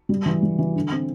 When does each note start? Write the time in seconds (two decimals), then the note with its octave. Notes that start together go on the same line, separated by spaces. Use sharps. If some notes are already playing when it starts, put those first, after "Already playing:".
0.09 G3
0.26 E3
0.43 G3
0.59 E3
0.75 D3
0.92 C4